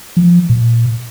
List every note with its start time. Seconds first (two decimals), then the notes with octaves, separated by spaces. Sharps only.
0.17 F3
0.50 A#2